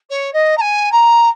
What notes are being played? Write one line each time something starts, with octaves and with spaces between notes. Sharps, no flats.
C#5
D#5
A#5
G#5
A#5